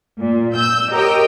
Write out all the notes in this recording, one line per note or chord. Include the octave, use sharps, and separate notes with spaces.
A#2
E6 G6
G4 A#4 C#5 D#5 G5